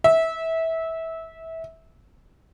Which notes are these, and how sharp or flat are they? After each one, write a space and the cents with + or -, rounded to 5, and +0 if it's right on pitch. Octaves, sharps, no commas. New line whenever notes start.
E5 -20